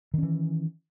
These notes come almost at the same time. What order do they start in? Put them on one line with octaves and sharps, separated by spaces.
D#3 C#4 E3